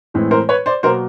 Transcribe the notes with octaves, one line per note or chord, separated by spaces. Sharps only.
A2 E3 G#3 C4
A#4 C5
B4 C#5
C5 D5
B2 F#3 A#3 A#4 C5